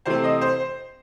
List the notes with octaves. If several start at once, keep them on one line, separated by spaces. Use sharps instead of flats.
C3 E3 A3 C4 C5
D#5
C5